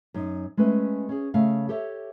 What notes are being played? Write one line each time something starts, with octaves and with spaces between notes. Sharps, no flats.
F#2 D#4
G#3 A3 C#4 B4
C#4 G#4
C#3 A3 F5
G4 A4 C#5 E5